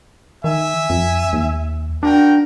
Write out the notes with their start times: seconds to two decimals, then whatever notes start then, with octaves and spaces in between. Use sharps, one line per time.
0.44 D#3 E5 G#5
0.90 F2
1.33 D#2
2.03 D4 F#4 A#4 G5